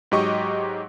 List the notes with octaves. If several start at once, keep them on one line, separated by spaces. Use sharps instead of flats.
G#2 F#3 G4 D#5 C#6